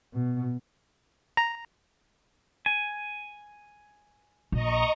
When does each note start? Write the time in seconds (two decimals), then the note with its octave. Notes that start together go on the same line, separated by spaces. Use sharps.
0.13 B2
1.37 A#5
2.66 G#5
4.52 A#1 D#5 A#5 C#6